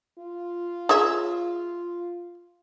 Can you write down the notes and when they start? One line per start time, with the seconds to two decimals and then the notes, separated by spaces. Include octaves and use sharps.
0.18 F4
0.89 G#4 C#5 E5